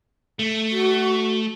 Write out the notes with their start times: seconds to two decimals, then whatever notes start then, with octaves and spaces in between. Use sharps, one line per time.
0.39 A3
0.71 F#4